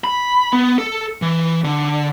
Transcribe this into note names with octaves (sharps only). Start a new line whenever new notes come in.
B5
B3
A4
E3
D3